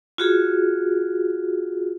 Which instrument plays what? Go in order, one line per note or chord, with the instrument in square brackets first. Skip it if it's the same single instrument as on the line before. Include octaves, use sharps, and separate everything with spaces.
[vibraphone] F4 F#4 G#4